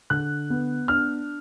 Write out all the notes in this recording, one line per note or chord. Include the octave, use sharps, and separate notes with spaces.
D3 F#6
B3
D4 F6